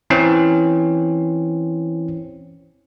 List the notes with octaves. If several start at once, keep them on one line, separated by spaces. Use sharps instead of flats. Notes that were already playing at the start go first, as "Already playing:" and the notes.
E3 C4 C#4